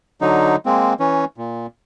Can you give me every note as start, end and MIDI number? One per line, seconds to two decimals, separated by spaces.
0.21 0.56 50
0.21 0.56 54
0.21 0.56 63
0.66 0.94 56
0.66 0.94 58
0.66 0.94 60
1.00 1.25 52
1.00 1.25 61
1.37 1.67 46